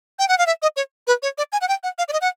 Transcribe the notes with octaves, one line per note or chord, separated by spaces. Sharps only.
G5
F#5
F5
E5
D#5
C#5
B4
C#5
D5
G#5
F#5
G5
F#5
F5
D5
D#5
F#5